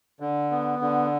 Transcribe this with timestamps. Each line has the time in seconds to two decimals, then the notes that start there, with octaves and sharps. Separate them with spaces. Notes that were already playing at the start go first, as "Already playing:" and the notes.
0.20 D3
0.51 B3
0.82 D3